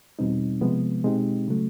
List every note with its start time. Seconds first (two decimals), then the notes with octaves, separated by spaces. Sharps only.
0.19 E2 B2 G3 C4 D#4
0.61 C3 F3 G#3 B3
1.04 B2 G#3 C4 D#4 G4
1.48 C#3 F#3 A3